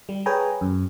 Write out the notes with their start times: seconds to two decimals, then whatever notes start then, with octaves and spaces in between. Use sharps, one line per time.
0.09 G3
0.26 G#4 B4 C#5 G5 G#5 A#5
0.61 F#2